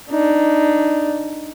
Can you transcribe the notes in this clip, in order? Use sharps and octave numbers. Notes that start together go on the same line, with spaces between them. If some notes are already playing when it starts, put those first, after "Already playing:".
D4 D#4